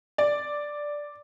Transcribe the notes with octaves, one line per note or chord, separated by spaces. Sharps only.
D5